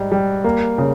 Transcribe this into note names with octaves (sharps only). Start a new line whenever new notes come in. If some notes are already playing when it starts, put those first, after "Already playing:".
Already playing: G#2 G3
G3
A#3
C#3